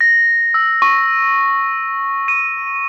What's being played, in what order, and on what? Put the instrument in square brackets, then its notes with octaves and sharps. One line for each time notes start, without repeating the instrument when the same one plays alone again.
[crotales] A#6
E6
C#6
D#7